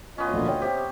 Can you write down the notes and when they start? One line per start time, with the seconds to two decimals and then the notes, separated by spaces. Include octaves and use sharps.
0.18 D2 B3 C#4 F4 D#5
0.34 A#1 A#2 D3
0.48 C#5 F#5 G5
0.62 C3 G4